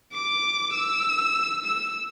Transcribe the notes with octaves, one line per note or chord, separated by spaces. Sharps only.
D6
E6
E6